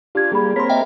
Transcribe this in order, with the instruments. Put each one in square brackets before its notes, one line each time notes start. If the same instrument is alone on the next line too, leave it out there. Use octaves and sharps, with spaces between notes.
[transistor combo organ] D4 F4 [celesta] G4 G#6
[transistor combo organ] G3 A#3 [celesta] G#4 B5
[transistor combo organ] A#3 C4 A#4 [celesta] C#5 [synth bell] C6 B6
[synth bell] D#5 E5 G5